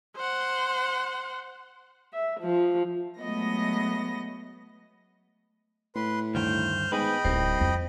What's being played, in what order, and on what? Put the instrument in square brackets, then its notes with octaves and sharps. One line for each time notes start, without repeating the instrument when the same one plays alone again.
[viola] C5 F#5
[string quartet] E5
F3
F#3 G#3 A3 B3 D#5 A#6
[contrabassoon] A2 [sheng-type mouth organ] B4 C6
[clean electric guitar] D2 G2 D#3 [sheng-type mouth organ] C5 F6 G6
[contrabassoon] G#2 [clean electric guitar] B3 G#4 B4 [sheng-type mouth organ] D#5 G5 B5
[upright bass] D1 [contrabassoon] C2 [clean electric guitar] C4
[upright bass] F2